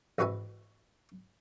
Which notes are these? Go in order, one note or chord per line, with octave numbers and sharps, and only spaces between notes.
A1 G#2 F#4 B4 E5 G#5